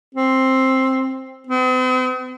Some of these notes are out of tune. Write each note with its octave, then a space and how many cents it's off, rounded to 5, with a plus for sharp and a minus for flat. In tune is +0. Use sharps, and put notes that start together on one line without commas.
C4 +10
C4 -45